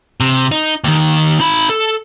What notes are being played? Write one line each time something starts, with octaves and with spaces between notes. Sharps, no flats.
C3
D#4
D#2 D#3
D#4 B5
A4